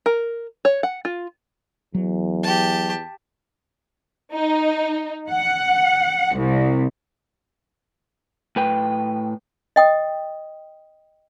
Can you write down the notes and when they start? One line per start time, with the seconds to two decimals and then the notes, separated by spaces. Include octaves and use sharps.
0.06 A#4
0.65 C#5
0.83 F#5
1.05 F4
1.95 E2 F#3
2.43 G4 A5
4.34 D#4
5.29 F#5
6.37 C2
8.56 A2 B4 G5
9.76 D#5 G5 D#6